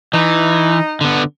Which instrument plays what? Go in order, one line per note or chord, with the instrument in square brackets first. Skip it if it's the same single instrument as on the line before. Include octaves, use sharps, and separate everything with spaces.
[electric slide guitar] E3 [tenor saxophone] D#4
[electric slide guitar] D3 B3